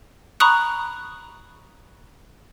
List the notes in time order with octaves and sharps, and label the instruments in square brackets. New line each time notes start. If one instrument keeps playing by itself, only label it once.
[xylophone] A#5 B5 C#6 D#6 F#6